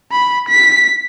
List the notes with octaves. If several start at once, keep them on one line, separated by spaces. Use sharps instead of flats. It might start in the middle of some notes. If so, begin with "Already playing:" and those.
B5
B6